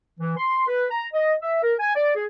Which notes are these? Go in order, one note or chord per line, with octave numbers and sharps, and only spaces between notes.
E3
C6
B4
A#5
D#5
E5
A#4
G#5
D5
G#4